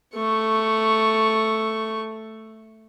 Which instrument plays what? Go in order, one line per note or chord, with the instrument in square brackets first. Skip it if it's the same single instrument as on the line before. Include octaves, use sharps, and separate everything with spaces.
[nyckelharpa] A3 C#6